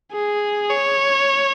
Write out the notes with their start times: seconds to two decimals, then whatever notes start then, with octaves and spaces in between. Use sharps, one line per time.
0.13 G#4
0.71 C#5